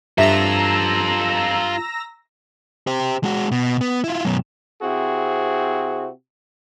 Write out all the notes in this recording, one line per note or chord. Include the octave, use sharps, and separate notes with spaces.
G2 F4 A4 E5 A#5 E6 A#6
G4 C5
G#3 F#4
B2
B3
E4 F4
F#2 B2
C3 C4 E4 F#4 G#4